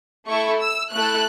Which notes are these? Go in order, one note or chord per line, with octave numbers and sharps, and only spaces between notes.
A3 E4 A4 C#6
E6
A3 E4 A4 F#6